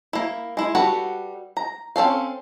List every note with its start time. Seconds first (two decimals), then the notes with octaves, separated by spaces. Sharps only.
0.13 A#3 E4
0.57 G#3 E4
0.75 G3 F#4 A4 B4 F#5
1.57 A#5
1.96 C4 C#4 A4 F5